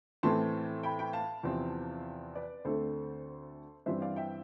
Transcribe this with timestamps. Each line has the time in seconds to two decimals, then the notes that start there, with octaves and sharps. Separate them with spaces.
0.23 A2 E3 A3 C4 A5 C6
0.83 G5 B5
0.99 G5 B5
1.13 F5 A5
1.43 E2 C3 F3 C4
2.35 B4 D5
2.65 D2 D3 A3 C4 A4 C5
3.86 G2 E3 G3 C4 C5 E5
4.02 D5 F5
4.16 E5 G5